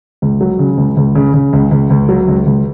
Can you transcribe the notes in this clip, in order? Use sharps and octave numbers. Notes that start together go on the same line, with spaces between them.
C#2
F#3
C#3
C#2
C#2
C#3
C#3
C#2
C#2
C#2
F#3
C#2
C#2